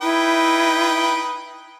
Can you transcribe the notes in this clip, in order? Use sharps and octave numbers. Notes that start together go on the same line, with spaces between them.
D#4 E4 B4 G5